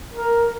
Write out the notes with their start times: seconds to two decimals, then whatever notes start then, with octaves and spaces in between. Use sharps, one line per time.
0.13 A#4